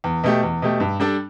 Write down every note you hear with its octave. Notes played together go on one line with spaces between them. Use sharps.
E2
B2 A3 G4
E2
B2 A3 G4
G2
G3 D4 A4